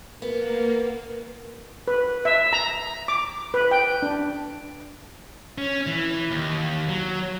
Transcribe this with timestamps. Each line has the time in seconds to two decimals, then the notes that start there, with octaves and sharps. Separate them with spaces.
0.22 A#3 B3 A#4
1.88 B4
2.25 E5
2.53 A#5
3.08 D6
3.54 B4
3.71 G5
4.02 D4
5.58 C#4
5.87 E3
6.31 D#2
6.89 F#3